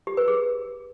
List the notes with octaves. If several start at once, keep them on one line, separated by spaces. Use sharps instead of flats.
G4
B4
G#4